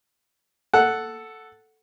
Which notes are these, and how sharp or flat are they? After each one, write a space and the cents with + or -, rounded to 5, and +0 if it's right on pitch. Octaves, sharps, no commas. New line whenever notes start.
A4 +0 F#5 +0